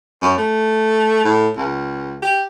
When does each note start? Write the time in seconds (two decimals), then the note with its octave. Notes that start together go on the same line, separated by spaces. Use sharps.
0.22 F#2
0.37 A3
1.24 A2
1.57 C#2
2.22 G4